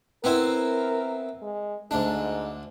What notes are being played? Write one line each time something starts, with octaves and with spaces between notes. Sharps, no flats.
B3 C4 E4 A#4
G#3
D2 G#2 D4